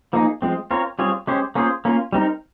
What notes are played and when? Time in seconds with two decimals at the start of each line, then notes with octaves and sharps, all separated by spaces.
0.13 F3 A#3 D#4 G#4
0.42 F3 G#3 C4
0.71 C4 F4 A#4 C#5
0.99 G3 C4 F4 G#4 C#5
1.27 G#3 C#4 G4 C5
1.55 A#3 C#4 F4 G#4 C5
1.85 A#3 C#4 F4
2.13 G3 C4 D#4 A#4